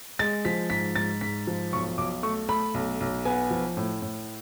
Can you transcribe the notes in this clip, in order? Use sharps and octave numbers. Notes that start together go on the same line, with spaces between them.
G#3 A6
F3 B6
G#2 B6
G#2 A6
G#2 B6
F3
B1 C#6
B1 D6
A3 C#6
A3 B5
B1
B1
B3 G#5
F3
A2
A2